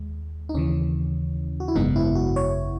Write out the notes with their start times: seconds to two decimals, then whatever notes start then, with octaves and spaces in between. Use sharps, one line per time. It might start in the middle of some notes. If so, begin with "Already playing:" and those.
Already playing: D#2 G#3
0.49 D#4
0.55 D#2 C#3 E3 C#4
1.60 F#4
1.68 E4
1.75 G#1 F#2 C#3 G#3 B3 D#4
1.96 E4
2.15 F#4
2.36 C#5